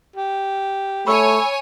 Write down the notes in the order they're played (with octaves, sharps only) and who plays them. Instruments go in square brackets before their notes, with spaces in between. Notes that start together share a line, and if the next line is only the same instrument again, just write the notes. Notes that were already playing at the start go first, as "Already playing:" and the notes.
[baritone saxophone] G4
[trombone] A3 [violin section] C#5 G#5 [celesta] B5 C#6 E6